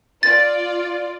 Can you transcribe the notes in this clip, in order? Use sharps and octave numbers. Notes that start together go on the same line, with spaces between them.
F4 D5 A6